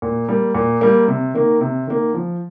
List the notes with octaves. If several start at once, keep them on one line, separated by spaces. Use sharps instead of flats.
A#2
G3 A#3
A#2
G3 A#3
C3
D#3 A#3
C3
D#3 A#3
F3